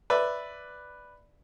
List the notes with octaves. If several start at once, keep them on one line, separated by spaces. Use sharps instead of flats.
B4 D5 E5